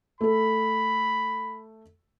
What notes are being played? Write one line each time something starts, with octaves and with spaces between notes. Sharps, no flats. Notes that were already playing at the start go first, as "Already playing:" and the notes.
A3 A4 B5